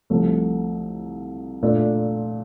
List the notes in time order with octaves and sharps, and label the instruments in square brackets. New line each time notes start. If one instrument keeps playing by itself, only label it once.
[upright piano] C2 C3 F3 A3
A#2 A3 D4 F4